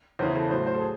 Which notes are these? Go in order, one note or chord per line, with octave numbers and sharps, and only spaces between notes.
E2 C#3 E3 C5
A4
A2 F#3 C5
C5
A4
G#4